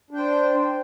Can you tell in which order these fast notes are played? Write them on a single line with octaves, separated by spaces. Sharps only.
D4 G5 C5